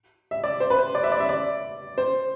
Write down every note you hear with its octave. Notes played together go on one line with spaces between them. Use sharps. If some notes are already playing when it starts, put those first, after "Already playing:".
E5
D5
C5
B4
C5
D5
E5
D5
E5
D5
C5